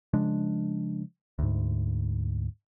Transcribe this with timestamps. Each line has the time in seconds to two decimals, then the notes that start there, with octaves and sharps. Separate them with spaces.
0.14 C#3 F3 G#3 D4
1.39 D2 G#2